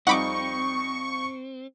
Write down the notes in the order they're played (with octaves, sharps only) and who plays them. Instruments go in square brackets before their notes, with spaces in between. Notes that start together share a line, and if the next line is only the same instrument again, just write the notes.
[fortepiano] F2 G3 D#4 [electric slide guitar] C4 [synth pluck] F#5 B5 D6 [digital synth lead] C#6